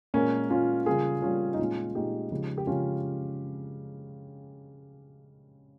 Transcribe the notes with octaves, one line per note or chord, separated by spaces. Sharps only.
A#2 G#3 A#3 C#4
A#2 G#3 C#4 F4
C#3 G3 A#3 F4 G#4
C#3 G3 A#3 C#4 F4
D#4
A#2 G#3 C#4 F4
A#2 G#3 D#4 G4
C#3 F3 G#3
G4
C#3 F3 G#3 C#4 F4